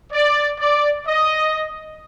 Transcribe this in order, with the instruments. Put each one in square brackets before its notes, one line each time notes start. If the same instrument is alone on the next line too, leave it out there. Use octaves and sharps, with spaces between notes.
[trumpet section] D5
D5
D#5